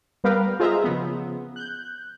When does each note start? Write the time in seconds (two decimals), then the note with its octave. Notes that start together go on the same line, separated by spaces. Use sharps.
0.24 G3 B3 A#4 B4 F5 G5
0.60 F4 G#4 C5 D#5 E5 A#5
0.84 C#3 F3 B3
1.56 F#6 G6